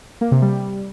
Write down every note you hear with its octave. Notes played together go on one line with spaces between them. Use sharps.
A#3
C3
G3